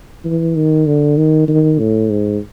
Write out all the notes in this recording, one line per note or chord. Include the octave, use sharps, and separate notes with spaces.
E3
D#3
D3
D#3
D#3
A2
G#2